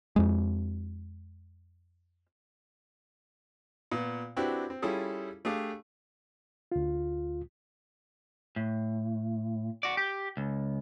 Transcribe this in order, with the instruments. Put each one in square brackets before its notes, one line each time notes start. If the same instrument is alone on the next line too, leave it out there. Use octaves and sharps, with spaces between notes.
[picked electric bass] F2 G#3
[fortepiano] A#2 B3
C4 D4 E4 F#4 G4 B4
C4
G3 C#4 E4 F4 G#4 A4
A3 D4 G4 G#4 D5 F5
[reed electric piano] D2 F4
[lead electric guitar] A2
F#4 D5
G4
C#2